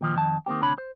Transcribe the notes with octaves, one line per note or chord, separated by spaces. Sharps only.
A#2 D#3 F3
F2 D#3 A5
D#3 A#3 C4 G4
D2 C3 D4 C#5 B5
C5